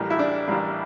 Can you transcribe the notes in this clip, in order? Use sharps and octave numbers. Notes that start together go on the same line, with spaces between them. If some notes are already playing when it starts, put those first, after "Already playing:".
Already playing: A1 A2 G3 A#3
E4
D4
A1 A2 G3 A#3